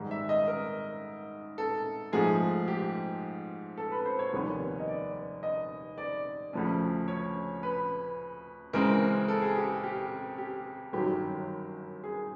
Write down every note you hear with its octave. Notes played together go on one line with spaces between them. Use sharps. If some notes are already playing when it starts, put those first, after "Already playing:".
Already playing: G#2 D#3 G3
E5
D#5
A#4
A4
G#2 F3 A3 G#4
G4
A4
B4
C5
C#5
F1 D#2 D#3 G3 B3
D#5
D5
D#5
D5
D2 C#3 F3 A3 C#4
C#5
B4
C#2 C#3 E3 G#3 C4 A#4
A4
G#4
G4
G4
G4
G1 F#2 D#3 F#3 G4
G#4